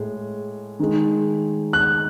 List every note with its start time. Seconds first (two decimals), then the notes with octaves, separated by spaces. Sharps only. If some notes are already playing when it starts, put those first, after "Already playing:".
Already playing: A2 G#3
0.79 D#3 G#3
1.73 F#6